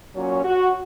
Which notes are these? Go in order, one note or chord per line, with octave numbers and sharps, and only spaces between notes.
A#2 F#3 C#4
F#4